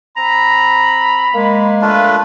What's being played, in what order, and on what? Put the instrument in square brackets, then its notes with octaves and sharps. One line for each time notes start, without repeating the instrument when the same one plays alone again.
[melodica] C4 [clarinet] A#5 [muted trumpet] B5
[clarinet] G#3 [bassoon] A#3
[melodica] A3 D4 F4 [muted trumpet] B4